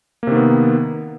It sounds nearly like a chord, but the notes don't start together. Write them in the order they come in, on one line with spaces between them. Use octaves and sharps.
A#3 C3 D#3 B3